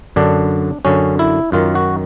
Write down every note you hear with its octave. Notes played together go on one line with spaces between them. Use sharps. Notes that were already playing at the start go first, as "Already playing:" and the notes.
F#2 D3 D4
F#2 D3 C#4
E4
F#2 D#3 F4
F#4